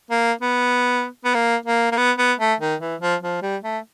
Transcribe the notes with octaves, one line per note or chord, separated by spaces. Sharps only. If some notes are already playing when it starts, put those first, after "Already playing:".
A#3
B3
B3
A#3
A#3
A#3
B3
B3
A3
D#3
E3
F3
F3
G3
A3